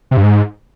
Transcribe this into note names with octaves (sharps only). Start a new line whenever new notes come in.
C3
G2
G#2